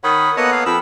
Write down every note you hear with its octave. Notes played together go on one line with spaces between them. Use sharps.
D#3 C#5 F#5 B5 D#6
A#3 B3 A4 C#5 D#5 F#5
F5
F2 B5 E6